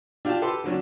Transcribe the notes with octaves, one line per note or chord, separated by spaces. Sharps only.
D4 F4 G4 F5 G5 A5
G4 A4 B4 C6
D3 F#3 C#4 D4